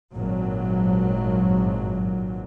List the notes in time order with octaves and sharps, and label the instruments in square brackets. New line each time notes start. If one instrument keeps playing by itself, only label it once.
[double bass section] G#1 G2 A#2 F#3